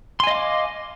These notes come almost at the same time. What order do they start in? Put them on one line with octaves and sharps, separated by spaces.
C6 G#5 D#5 F5 D6